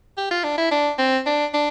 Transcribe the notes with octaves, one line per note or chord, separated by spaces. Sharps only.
G4
F4
D4
E4
D4
C4
D4
D4